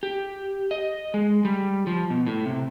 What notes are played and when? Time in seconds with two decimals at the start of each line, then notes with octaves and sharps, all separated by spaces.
0.03 G4
0.71 D#5
1.14 G#3
1.45 G3
1.87 F3
2.10 B2
2.26 A2
2.46 C3